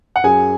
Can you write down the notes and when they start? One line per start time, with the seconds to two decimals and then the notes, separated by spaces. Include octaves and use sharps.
0.16 F#5
0.23 F#2 G#4 G#5